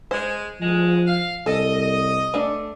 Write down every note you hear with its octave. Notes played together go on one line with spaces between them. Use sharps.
G#3 C5
D2 F3 G#3
F5
C2 A4 D#5
A3 D4